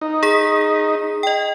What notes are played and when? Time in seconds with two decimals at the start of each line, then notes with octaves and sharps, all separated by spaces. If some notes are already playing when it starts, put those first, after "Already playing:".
0.01 D#4
0.23 G#4 B6
1.23 D#5 G5